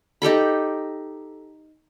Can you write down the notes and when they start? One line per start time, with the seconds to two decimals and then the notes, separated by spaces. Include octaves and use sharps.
0.22 D#4 G4 A4 B5